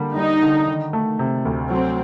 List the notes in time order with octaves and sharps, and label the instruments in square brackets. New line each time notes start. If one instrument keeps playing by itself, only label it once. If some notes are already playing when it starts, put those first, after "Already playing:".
Already playing: [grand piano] D3 G3 A#3
[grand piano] G3 [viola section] D#4
[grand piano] D3
D#3
A3
C3
D2
[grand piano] F#3 [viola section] C4